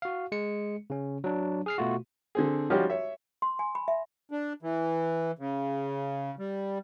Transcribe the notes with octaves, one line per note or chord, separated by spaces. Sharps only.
F#4 F5
G#3 C#7
C#3 C#4
F#3 D4
G#4 F6 C7
B2 A3 F4 F#4
D3 C4 G#4
F3 G3 C#4 D#4 F#4 G4
C#5 E5
C6
G#5
B5
E5
D4
E3
C#3
G3